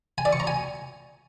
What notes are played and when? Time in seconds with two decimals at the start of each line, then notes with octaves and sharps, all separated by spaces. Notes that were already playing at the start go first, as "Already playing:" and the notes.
0.18 G#5
0.25 D5
0.33 C#6
0.40 A#5
0.47 G#5